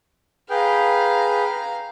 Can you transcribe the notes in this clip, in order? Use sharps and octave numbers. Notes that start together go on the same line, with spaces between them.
G#4 B4 F5 G5 A#5